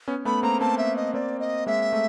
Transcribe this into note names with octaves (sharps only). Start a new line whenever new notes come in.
B3 C#4
A3 B3 B5
A#3 C4 A#5
A#3 C4 A5
E5
D#5
A#3 C4 D5
D#5
G#3 A#3 E5
A3